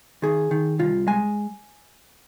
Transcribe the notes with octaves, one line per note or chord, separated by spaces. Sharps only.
D#3 G#4
D#3
C2 F4
G#3 G#5